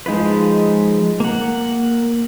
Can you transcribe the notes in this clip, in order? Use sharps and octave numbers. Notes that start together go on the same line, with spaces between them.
F3 G#3 D#4 F4 B4
A#3 F#5